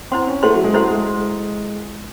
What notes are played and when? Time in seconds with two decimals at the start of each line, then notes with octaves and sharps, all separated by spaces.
0.11 C4 E4 C5 F#5 C6
0.27 C#4
0.42 A3 E4 C5 F#5 C6
0.54 F#3
0.64 G#3
0.74 A3 E4 C5 F#5 C6
0.91 G#3